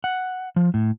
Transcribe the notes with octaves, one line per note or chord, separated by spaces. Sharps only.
F#5
F3
A2